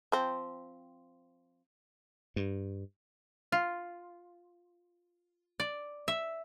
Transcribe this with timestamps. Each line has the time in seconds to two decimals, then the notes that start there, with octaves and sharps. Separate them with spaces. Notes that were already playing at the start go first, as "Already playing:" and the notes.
0.12 F3 C4
2.36 G2
3.52 F4
5.60 D5
6.08 E5